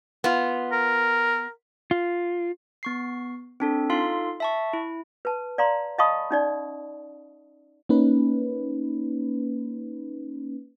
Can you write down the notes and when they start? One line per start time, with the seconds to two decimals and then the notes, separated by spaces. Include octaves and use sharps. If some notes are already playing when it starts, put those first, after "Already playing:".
0.24 B3 F4
0.72 A#4
1.91 F4
2.83 B3 C#6 C7
3.60 C4 D4 A4
3.90 D#4 F4 A4 F5 C6
4.40 E5 A5 C#6
4.73 E4
5.25 B4 A5
5.58 D5 F5 A#5 C6
5.98 D#5 F5 A5 B5 C#6 D#6
6.31 C#4 D#4 D5
7.89 A#3 C#4 D#4 B4